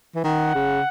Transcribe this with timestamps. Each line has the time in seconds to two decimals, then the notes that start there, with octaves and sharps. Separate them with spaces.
0.15 E3
0.24 D#3 F#5
0.55 C#3